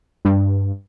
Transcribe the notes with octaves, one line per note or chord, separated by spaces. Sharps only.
G2